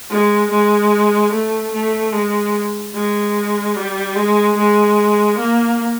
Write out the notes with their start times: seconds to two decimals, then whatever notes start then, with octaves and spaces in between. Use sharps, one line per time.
0.10 G#3
0.50 G#3
1.32 A3
1.72 A3
2.12 G#3
2.94 G#3
3.76 G3
4.16 G#3
4.56 G#3
5.38 A#3